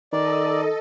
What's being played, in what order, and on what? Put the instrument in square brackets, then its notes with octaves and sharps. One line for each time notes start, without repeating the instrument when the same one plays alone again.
[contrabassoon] D#3 [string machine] A4 D#5 [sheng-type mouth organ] D5